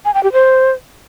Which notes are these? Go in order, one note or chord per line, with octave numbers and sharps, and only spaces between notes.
G#5
G5
G4
C5